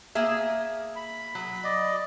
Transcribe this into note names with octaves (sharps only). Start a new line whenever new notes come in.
A#3 G#4 E5
B5
F#3
D5 D#5